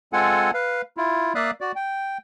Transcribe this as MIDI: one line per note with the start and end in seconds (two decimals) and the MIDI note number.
0.13 0.51 56
0.13 0.51 60
0.13 0.51 65
0.13 0.51 69
0.13 0.51 78
0.13 0.51 80
0.54 0.82 71
0.54 0.82 77
0.97 1.33 64
0.97 1.33 65
1.35 1.51 58
1.35 1.51 74
1.35 1.51 76
1.35 1.51 77
1.35 1.51 87
1.35 1.51 90
1.61 1.72 66
1.61 1.72 74
1.76 2.18 79